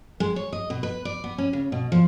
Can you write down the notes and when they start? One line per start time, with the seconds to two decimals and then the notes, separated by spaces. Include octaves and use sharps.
0.20 G#3
0.36 C#5
0.53 D#5
0.70 B2
0.83 B4
1.05 D5
1.24 B3
1.38 C#4
1.53 C#3
1.72 B2
1.92 F3